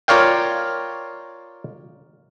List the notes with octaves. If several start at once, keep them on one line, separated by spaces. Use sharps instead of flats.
F4 A#4 C#5 D5 F5 G5